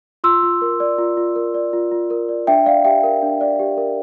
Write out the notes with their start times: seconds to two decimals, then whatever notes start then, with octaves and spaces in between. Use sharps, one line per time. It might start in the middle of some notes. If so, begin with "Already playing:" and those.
0.24 F4 C6 E6
0.43 F4
0.62 A#4
0.80 D5
0.98 F4
1.17 F4
1.36 A#4
1.54 D5
1.73 F4
1.92 F4
2.10 A#4
2.29 D5
2.47 D4 E5 G5
2.66 D5 F5
2.84 G4 E5 G5
3.03 A#4
3.22 D4
3.41 D5
3.59 G4
3.77 A#4